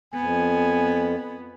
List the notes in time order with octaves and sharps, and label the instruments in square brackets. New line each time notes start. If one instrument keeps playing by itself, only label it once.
[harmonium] F2 [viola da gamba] B3 [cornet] G#5